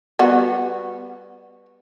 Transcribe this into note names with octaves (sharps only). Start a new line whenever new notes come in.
G3 B3 F#4